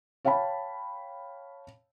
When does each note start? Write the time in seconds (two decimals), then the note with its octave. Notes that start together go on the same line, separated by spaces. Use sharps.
0.25 C#5 F5 G5 A5 B5